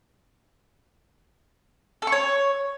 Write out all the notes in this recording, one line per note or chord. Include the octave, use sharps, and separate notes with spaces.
A4
C#6
C#5